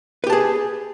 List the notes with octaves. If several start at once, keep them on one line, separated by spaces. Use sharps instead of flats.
G4 G#4 B4 A5